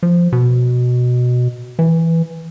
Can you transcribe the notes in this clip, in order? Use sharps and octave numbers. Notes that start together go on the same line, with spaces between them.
F3
B2
E3